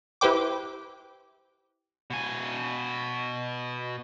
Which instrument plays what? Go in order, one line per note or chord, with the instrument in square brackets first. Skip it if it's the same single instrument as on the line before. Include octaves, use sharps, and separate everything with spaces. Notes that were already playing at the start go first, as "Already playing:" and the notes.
[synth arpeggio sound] E4 G4 B4 C5 G5 D6
[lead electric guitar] B2 G#5